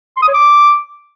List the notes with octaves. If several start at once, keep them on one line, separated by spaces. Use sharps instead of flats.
C6
D#6
C#5
D6